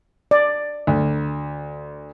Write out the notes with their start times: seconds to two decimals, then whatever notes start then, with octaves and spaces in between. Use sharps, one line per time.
0.31 D5
0.87 D2